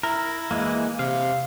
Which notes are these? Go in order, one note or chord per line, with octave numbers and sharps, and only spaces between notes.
E4 A#4
E3 G#3 A#3
C3 F5